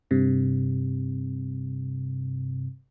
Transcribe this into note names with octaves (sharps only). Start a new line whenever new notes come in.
G2 C3